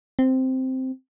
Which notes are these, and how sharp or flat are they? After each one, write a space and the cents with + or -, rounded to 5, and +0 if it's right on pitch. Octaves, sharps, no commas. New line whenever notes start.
C4 -5